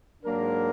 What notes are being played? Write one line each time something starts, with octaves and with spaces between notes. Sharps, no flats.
G#2 F#3 A#3 D4 A#4